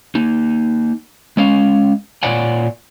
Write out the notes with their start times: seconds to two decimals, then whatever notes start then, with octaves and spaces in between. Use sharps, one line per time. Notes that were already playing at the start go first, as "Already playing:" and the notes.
0.15 A#3 D#4
1.37 G#3 C#4 F5
2.23 A#2 F4 C#5 D5 F#5 G#5